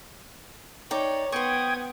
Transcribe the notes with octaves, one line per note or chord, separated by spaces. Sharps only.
D#4 C#5 D5 G5
B3 C5 G5 C#6 D#6 G#6